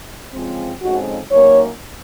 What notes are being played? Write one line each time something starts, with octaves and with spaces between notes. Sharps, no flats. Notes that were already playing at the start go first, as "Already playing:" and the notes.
C#3 F3 G#3 C4
F2 C#3 G#3 C4 D#4 F#4
F#2 D#3 A#3 C#5